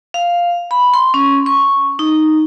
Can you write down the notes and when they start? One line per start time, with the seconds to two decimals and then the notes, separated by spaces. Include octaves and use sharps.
0.14 F5
0.71 B5
0.94 C6
1.14 C#4
1.46 C#6
1.99 D#4